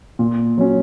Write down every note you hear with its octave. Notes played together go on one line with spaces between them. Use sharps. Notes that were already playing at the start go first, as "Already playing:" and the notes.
A#2
F#3 C#4